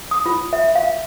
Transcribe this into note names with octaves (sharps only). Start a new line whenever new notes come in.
D#6
F4
E5
F5